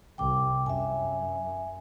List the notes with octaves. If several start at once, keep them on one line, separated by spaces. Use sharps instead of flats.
C2 G5 D6
F#2 E5 G#5